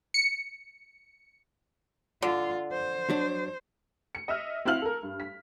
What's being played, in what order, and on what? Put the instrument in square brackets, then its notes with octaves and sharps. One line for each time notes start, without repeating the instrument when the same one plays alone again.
[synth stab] C#7
[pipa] D3 [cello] F4
[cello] C5
[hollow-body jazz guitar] F#3 D4
[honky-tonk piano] C#7
D#5 E5 E6 F6
C4 E4 F#4 F5 F6 F#7
A4 A#4
G2
B6